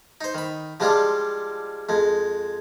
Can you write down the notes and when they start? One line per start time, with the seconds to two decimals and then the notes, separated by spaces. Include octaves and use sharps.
0.21 D#4 C5
0.35 D#3 B5
0.80 F3 G3 G#3 D4 F4
1.89 F2 G#3